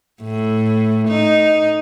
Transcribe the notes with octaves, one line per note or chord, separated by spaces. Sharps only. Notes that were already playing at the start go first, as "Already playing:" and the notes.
A2
D#4